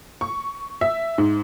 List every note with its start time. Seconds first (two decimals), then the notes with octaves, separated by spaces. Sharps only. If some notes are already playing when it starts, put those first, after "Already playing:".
0.21 C#6
0.81 E5
1.18 G#2